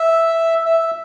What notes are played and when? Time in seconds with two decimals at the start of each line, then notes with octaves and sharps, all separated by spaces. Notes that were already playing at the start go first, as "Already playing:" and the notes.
Already playing: E5
0.66 E5